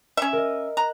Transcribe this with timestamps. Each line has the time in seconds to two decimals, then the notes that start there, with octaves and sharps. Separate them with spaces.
0.17 C#4 E5
0.33 A#4 D#5
0.77 A#5 F#6